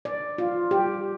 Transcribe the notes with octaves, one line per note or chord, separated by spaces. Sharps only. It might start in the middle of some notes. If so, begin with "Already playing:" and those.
D5
F4
G4